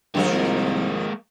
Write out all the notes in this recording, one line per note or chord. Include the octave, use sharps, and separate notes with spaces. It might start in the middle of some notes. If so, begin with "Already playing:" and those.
G2 D#3 F3 G#3 A#3 A#4
C2